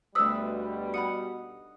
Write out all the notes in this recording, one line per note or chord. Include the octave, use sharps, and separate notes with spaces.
D2 B2 G3 D4 B4 D#6 E6
D#4 F#5 B5 D#6 C#7